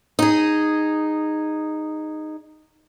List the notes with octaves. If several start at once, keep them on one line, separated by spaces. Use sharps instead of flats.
D#4 G#4